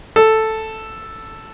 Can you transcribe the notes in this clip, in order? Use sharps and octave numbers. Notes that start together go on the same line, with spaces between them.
A4